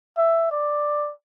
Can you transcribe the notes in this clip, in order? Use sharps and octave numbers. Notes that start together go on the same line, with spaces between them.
E5
D5